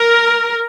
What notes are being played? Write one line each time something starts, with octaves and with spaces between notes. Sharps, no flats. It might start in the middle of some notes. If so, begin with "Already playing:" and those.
Already playing: A#4